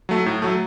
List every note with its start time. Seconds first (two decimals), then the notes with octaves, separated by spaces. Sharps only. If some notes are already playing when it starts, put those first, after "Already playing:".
0.09 F#3 A3
0.26 A2
0.42 F#3 A3